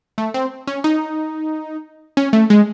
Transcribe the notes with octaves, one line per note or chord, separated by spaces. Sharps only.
A3
C4
C#4
D#4
C#4
A3
G#3